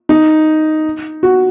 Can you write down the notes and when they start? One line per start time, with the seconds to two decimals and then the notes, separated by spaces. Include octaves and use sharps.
0.09 D#4
1.23 F#4